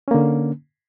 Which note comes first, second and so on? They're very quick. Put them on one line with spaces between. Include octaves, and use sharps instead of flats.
C#4 A#3 D3